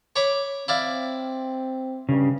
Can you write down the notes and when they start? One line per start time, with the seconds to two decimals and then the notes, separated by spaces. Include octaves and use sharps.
0.16 C#5 B5 D6
0.68 C4 E4 D5 F5
2.09 G2 C#3